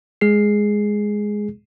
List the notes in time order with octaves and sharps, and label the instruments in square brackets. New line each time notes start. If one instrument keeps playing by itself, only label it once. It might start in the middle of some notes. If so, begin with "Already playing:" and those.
[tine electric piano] G#3 G#4 C7